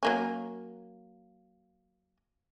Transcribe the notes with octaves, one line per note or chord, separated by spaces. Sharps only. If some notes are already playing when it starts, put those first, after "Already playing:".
F#3 A#3 C#4